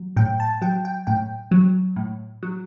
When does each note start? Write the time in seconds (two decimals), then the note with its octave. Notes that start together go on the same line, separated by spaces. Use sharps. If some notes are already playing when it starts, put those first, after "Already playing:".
Already playing: F#3
0.17 A2 G5
0.40 A5
0.62 F#3 G5
0.85 G5
1.07 A2 G5
1.51 F#3
1.96 A2
2.43 F#3